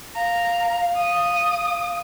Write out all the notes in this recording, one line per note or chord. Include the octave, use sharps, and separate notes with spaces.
F5 A#5
D#6